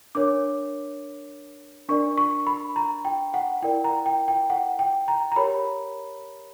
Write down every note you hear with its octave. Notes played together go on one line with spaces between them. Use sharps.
D4 A#4 C#5 D6
D4 A#4 D5 C#6
C#6
B5
A#5
G5
F#5
E4 A#4 D5 G5
A#5
G5
G5
F#5
G5
A#5
A#5
G4 A#4 C#5 B5